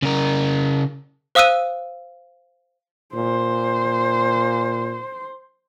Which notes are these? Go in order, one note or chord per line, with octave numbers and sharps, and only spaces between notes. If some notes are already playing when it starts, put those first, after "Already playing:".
C#3 A#4
C5 F5 D#6 E6 F#6 D#7
A#2 C5